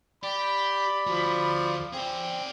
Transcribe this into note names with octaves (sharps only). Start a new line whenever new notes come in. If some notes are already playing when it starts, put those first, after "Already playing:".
G4 D5 B5
D2 F3 F#4
C4 G#4 D5